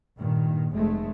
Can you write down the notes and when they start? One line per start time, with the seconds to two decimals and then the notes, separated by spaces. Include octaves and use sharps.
0.19 G2 A#2 D#3
0.72 F1 G#3 A3